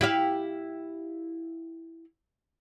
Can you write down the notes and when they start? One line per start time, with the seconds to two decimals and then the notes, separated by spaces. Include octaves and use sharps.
0.01 E4 G4 F5